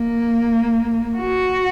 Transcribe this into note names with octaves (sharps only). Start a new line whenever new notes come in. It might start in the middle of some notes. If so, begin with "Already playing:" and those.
Already playing: A#3
F#4